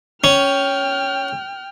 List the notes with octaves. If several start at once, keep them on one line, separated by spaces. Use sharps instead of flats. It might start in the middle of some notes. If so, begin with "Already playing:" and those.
C#4 G5 F6